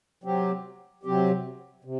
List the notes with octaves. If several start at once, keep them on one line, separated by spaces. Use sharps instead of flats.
C3 F#3 C4 G4
C3 F#3 C4 G4
C3